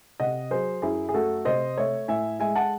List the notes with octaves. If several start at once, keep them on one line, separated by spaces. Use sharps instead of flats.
C3 D#5 F#5
F#3 G#4 C5
F#2 E4 G#4
G#4
A3 F#4 A4
C3 C5 D#5
A3 C#5 E5
A2 E5 G#5
G#3 E5 G#5
F#5 A5